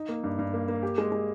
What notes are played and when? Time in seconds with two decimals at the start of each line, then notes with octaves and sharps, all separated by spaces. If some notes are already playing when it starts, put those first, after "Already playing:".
Already playing: D#4
0.09 A#3
0.24 G2
0.39 G2
0.54 A#3
0.68 A#3
0.83 G4
0.98 G#3
1.12 G#3